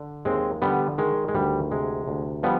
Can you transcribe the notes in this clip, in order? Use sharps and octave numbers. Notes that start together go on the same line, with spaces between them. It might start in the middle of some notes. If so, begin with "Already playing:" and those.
Already playing: D3
D#2 G#3 C4
D3 G3 B3
D#3 G#3
G#3
D2 G3
C3 G#3
D2
F3 G3 B3